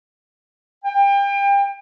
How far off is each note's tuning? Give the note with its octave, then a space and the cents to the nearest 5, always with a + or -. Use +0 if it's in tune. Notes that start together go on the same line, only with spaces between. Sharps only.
G5 +30